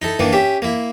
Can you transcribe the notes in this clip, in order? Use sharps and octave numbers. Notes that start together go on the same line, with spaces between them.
D#4 E4 A4
D#3 E3 A#3 D4
C#4 G4 E5
A#3 E4